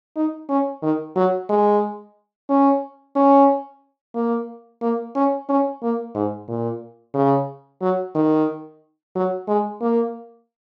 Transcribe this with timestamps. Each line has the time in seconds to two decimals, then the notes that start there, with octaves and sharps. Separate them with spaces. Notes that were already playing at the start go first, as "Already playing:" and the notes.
0.16 D#4
0.49 C#4
0.82 D#3
1.16 F#3
1.49 G#3
2.49 C#4
3.15 C#4
4.15 A#3
4.82 A#3
5.15 C#4
5.49 C#4
5.82 A#3
6.15 G#2
6.48 A#2
7.15 C#3
7.81 F#3
8.15 D#3
9.15 F#3
9.48 G#3
9.81 A#3